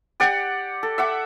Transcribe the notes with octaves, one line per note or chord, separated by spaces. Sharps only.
G4 D5 F#5
A4
E5 F#5 D6